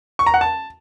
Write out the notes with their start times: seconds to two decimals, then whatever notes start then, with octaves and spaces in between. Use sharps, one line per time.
0.19 C#6
0.26 A#5
0.34 F#5
0.41 A5